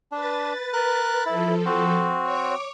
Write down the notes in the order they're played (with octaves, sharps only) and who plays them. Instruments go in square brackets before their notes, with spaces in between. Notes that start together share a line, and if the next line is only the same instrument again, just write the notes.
[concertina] D4 [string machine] B4 A6
[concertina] A#4 F#6
[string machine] F3 A4 [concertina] E4
[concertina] C4 F#4
[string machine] C#5 D6